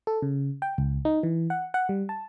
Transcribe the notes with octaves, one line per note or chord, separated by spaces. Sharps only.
A4
C#3
G5
C#2
D#4
E3
F#5
F#5
G3
A5